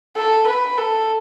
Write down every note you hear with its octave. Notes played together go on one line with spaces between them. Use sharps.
A4
B4
A4